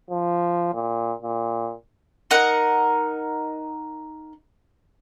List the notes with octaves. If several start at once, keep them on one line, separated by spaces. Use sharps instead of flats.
F3
A#2
A#2
D#4 A#4 F#5